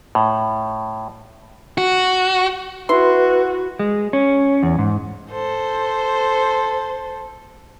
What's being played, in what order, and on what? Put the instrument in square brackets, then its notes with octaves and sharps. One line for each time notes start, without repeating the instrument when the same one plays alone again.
[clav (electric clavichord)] A2
[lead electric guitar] F#4
[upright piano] E4 [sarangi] F#4 [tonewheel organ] B4 [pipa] C6
[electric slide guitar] G#3
C#4
E2
G#2
[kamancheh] A4 C5